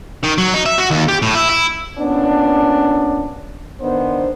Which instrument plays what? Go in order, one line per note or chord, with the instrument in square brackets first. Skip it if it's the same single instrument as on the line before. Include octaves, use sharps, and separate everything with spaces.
[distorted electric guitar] D#3
F#3
D#4
E5
F#4
D#2
G4
A2
E4
E4
[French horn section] A#2 B3 C#4 D4
D#3 B3 D4 C5